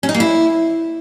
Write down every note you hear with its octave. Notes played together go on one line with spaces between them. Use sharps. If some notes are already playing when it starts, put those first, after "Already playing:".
C#4
D#4
A#3
E4